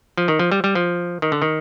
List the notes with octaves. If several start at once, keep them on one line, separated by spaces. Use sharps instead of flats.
F3
D#3
F3
G3
G3
F3
D#3
D3
D#3